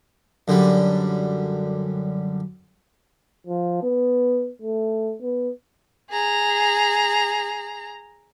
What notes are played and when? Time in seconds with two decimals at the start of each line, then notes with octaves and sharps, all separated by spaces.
0.48 F#2 D3 G3
3.47 F3
3.83 B3
4.62 A3
5.22 B3
6.11 G#4 A#5